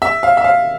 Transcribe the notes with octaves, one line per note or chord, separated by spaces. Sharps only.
E5
F5
E5
F5